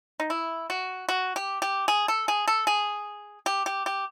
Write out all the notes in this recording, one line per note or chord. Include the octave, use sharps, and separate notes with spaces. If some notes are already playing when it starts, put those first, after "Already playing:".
D#4
E4
F#4
F#4
G4
G4
G#4
A4
G#4
A4
G#4
G4
G4
G4